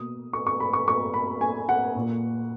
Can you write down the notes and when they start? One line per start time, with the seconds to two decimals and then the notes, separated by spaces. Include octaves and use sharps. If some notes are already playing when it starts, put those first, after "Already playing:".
Already playing: B2 A#3 D#6
0.33 C#6
0.47 C#6
0.60 B5
0.73 C#6
0.88 C#6
1.14 B5
1.41 G#5
1.69 F#5
1.95 A#2 A#3